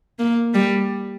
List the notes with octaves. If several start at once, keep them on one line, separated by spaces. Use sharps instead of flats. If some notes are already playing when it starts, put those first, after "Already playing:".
A#3
G3